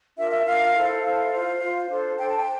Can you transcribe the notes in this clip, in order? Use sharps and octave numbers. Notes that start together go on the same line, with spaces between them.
D4 F4 A#4 E5
E5
D4 F4 A#4 F5
E4 A4 C5
E4 A4 C5 F5
F4 C5
F4 C5
D4 A4 C5
D4 A4 C5 G5
A5
G5